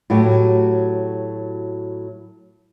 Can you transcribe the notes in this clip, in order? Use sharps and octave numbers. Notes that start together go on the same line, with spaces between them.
A2 F#3 A3 F#4 G4